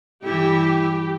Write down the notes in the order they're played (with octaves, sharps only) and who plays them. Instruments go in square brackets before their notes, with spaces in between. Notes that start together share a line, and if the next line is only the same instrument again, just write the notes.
[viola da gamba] G2 E3 E4 [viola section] G4